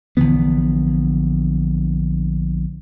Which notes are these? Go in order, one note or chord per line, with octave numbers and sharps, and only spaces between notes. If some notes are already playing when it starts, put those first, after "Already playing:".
A#1 D3 E3 B3